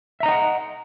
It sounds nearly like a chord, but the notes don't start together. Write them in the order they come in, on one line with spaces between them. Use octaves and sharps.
E5 A#5 D#5 G5 F#5